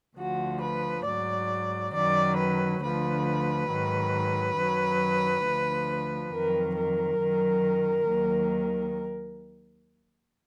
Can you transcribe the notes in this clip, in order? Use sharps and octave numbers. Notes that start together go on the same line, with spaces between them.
D2 D3 F3 F#4
B4
G#2 F#3 D5
F#2 D#3 F#3 D5
B4
D2 D3 F3 B4
G#2 D#3 F#3
F#2 D#3 F#3
D2 D3 F3
F2 D#3 F#3 A#4
A#4
F#2 D#3 F#3
D#2 D#3 F#3